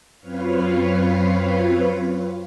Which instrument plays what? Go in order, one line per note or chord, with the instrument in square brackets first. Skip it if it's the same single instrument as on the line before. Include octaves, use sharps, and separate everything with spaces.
[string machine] F#2 C4 F4 B4 C#5 F5